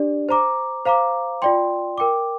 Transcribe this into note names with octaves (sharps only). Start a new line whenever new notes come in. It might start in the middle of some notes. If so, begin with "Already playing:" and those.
Already playing: D4 G4 D5
C5 A#5 D6
C5 F5 A#5 D6
F4 D5 G5 C6
A#4 G5 D6